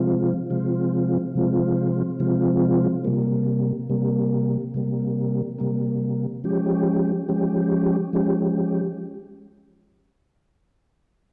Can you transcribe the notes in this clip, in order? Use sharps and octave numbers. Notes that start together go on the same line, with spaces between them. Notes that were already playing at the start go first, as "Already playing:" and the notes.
Already playing: C3 F3 G#3 C4 F4
C3 F3 G#3 C4 F4
C3 F3 G#3 C4 F4
C3 F3 G#3 C4 F4
C3 G3 A#3
C3 G3 A#3
C3 G3 A#3
C3 G3 A#3
F3 G#3 C#4 G4
F3 G#3 C#4 G4
F3 G#3 C#4 G4